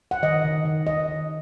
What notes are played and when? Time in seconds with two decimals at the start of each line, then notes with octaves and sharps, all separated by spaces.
0.11 F#5
0.23 D#3 D#5
0.44 D#3
0.65 D#3
0.87 D#3 D#5
1.08 D#3